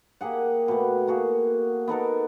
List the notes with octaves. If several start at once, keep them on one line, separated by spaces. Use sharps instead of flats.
A#3 G4 G#4 F#5
B2 A3
A#3 F#4 G#4
B3 D#4 A4 A#4